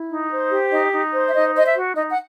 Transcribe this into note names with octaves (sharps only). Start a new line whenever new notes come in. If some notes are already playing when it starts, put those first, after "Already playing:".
Already playing: E4
D#4
C5
G4
D#4 D#5
D#4
C5
E5
D#4 D#5
C5 D#5
E5
F#4
D#4 D#5
F#5